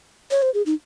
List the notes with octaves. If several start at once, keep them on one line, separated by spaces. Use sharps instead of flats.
C#5
C5
G#4
D#4